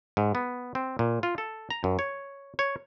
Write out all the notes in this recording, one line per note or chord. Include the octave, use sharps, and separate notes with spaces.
G#2
B3
C4
A#2
F4
A4
A#5
F#2
C#5
C#5